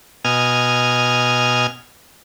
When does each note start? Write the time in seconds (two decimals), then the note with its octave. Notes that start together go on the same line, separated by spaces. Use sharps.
0.25 B2 D#5 G#5 F6